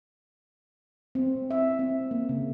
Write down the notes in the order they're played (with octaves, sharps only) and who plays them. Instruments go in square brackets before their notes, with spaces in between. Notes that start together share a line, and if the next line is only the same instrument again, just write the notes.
[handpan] C4
E5
C4
A#3
C#3